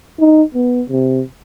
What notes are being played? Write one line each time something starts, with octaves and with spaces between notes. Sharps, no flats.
D#4
B3
C3